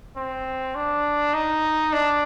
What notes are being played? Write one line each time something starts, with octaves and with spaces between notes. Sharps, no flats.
C4
D4
D#4
D4